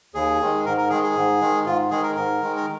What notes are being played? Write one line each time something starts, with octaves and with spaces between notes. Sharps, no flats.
D#2 G#4
D#3 G#3
G#2 A#4
A#4
D#3 G#3 G#4
G#4
G#2
D#3 G#3
G#2 F4
D#3 G#3 G#4
A#4
G#2 A#4
D#3 G#3
A#4